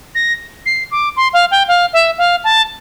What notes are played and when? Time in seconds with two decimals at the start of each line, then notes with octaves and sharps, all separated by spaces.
0.15 A#6
0.66 C7
0.91 D6
1.16 C6
1.33 F5
1.51 G5
1.68 F5
1.93 E5
2.18 F5
2.44 A5